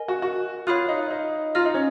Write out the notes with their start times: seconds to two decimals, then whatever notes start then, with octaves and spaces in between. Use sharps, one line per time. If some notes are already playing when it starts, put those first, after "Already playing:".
Already playing: A#4 D#5 G#5
0.08 F#4
0.22 F#4
0.67 F4 C#5 F5 B5 D#6 F#6
0.89 D#4
1.10 D#4
1.55 F4 D#5 A#5 F6
1.65 D#4
1.74 C#4